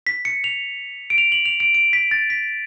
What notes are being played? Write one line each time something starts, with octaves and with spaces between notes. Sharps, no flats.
B6
C#7
F7
D7
F7
F#7
F7
D7
D7
B6
A6
B6